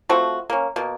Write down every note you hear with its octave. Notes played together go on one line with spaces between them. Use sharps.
F3 A3 C4 F#4
A#3 C#4
B2 A#3